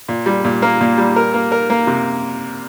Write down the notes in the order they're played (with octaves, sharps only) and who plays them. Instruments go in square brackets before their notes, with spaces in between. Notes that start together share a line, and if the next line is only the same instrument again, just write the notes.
[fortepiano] A#2
G3
A#2
A#3
A#2
G3
A#4
A#3
A#4
A#3
C3